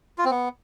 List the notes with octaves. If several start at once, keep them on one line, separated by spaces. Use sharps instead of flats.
F4
C4
B3